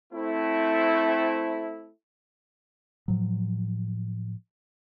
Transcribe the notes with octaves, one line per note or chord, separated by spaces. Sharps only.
A3 C4 E4
A2 F3 F#3